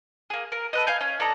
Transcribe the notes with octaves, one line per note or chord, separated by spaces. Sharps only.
A#3 G#4
A#4
A4 B4 D#5
F5 G#5 G6
C#4
D4 A4 D#5 A#5